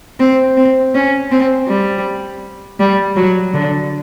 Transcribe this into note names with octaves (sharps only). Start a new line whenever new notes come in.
C4
C4
C#4
C4
G3
G3
F#3
D3